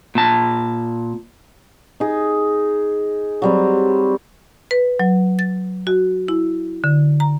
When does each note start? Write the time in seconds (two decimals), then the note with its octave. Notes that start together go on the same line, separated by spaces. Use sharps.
0.15 A#2 A5
2.00 D#4 G#4
3.42 F#3 G3 C4
4.71 B4
5.00 F#3
5.39 A6
5.87 F#4
6.28 E4
6.84 D3
7.20 A#5